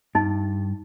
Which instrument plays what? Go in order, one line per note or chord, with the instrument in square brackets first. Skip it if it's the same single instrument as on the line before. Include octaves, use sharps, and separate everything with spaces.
[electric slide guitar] G2 [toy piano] D#4